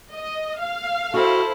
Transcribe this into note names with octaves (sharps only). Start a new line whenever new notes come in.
D#5
F5
E4 F#4 A4 C5 G5